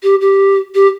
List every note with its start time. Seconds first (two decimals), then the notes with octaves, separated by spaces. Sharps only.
0.03 G4
0.21 G4
0.75 G4